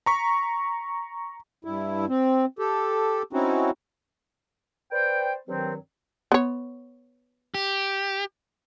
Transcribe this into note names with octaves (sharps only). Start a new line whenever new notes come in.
A#5 C#6 B6
G2 E4
C4
G4 A4
C4 C#4 D#4 E4 F#4
B4 C5 D5 G5
G2 D#3 F#3 C4
B3 C#5
G4